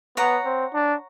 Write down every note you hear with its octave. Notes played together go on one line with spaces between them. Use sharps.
B3 C#5 F#5 A#5
C4
D4